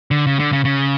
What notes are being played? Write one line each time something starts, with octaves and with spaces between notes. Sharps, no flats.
D3
C#3
D3
C#3
C#3